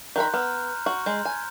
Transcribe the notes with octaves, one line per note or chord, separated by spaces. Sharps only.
D#3 A#4 B5 C6 F#6 G6
B3 A#5 F6
F#4
G#3 A#5 C6 G6
G#5